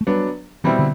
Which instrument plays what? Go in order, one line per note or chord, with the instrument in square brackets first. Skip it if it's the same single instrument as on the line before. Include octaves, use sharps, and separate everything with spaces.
[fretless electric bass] A3
[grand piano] F#3 B3 D4 [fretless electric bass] G3
[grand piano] B2 G3 C4 E4 [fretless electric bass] E3
[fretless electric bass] D3